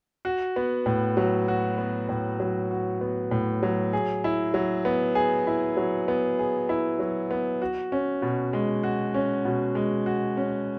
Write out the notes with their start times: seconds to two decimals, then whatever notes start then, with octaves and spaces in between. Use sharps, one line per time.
0.25 F#4
0.56 B3
0.86 A2
1.17 F#3
1.48 F#4
1.78 B3
2.09 A2
2.40 F#3
2.71 F#4
3.01 B3
3.31 A2
3.63 F#3
3.93 G#4
4.24 E4
4.54 F#3
4.85 B3
5.15 G#4
5.47 E4
5.77 F#3
6.08 B3
6.39 G#4
6.69 E4
6.99 F#3
7.31 B3
7.62 F#4
7.92 C#4
8.22 B2
8.53 G#3
8.83 F#4
9.14 C#4
9.45 B2
9.75 G#3
10.06 F#4
10.37 C#4